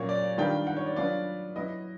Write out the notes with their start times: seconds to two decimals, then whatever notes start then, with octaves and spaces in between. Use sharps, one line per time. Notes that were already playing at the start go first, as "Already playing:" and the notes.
Already playing: A#2 F#3 A#3 C#4 C#5
0.09 D5
0.38 D#3 G3 B3 D4 F4 G5
0.67 F#5
0.77 C#5
0.86 D5
0.96 F#3 B3 D4 F4 D5
1.56 F#3 B3 E4 D#5